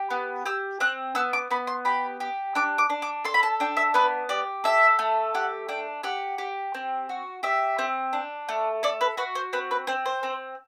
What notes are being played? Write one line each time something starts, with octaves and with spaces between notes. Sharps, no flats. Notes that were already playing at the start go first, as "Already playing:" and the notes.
Already playing: G4
B3
G4 E6
C4 F#6
B3 E6
D6
B3 B5
C6
G4 B5
G4
D4 D6
D6
D4
D6
A4 C6
B5
A5
D4 G5
E5
B3 B4
G4 D5
A4 E5
A3
G4 F#5
D4 G5
G4 F#5
G4
C4
F#4
G4 E5
C4
D4
A3
A4 D5
B4
F#4 B4
C5
C4 B4
B4
C4 C5
C5
C4